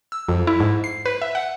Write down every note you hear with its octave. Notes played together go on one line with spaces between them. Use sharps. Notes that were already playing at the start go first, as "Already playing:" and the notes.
E6
F2
E4
G#2
C7
B4
E5
F#5